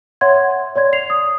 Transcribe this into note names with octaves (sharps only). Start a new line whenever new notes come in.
C#5 E5 F#5 C6 G#6
C#5 D5 C6 G#6
C7 F7
D#6